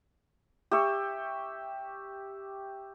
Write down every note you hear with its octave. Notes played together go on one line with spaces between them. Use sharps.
G4 E5 C#6